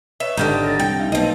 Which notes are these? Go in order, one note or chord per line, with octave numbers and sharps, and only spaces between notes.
B4 C#5 D#5 E5
G#1 D3 D#4 E4 G4 A5 F6 G6
D4 A6 A#6
C2 G5
D#4 E5 F5
B1 A#3 C4 B4 D#5 A5